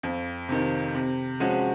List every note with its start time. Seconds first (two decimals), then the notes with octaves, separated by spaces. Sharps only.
0.03 F2
0.49 C3 D#3
0.95 C3
1.40 F3 G#3 C#4 F#4